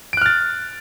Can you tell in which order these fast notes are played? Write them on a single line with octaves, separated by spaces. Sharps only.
D7 F#6 F6 A6